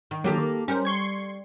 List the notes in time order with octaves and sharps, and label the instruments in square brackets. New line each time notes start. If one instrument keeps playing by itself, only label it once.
[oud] D#3
[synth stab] D#3 F#3 [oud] A#3 G4 A4
[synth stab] D#3
[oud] G3 [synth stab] C#4 A#4 C5
[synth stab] C6 C#6 G#6